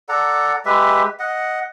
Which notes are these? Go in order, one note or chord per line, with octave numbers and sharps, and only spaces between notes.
A4 D5 F#5 A#5
G#3 G4 B4 E5
D#5 F#5